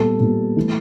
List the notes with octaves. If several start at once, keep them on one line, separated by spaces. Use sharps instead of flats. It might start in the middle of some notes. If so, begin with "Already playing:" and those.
Already playing: A#2 G3 B3 A4
A#2 G3 B3
E3 A3